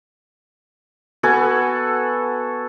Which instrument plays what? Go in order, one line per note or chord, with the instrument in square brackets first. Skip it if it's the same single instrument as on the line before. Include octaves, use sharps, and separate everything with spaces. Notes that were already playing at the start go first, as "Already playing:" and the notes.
[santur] B3 F#4 A4 G#5